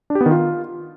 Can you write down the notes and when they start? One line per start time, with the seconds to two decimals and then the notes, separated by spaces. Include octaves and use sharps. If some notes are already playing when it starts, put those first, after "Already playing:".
0.10 D4
0.15 G4
0.21 B3
0.26 D#3
0.31 F4